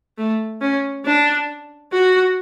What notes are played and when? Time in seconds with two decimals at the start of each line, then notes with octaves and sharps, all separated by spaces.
0.18 A3
0.61 C#4
1.06 D4
1.92 F#4